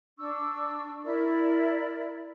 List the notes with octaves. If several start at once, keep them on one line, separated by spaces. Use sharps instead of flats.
D4 C#6 E6
E4 A#4 D5